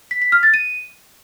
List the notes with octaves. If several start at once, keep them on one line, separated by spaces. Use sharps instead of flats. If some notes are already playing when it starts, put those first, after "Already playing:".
B6
B6
F6
A6
D#7